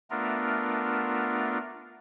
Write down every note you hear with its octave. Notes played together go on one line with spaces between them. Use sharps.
A3 B3 D4 F4 A#4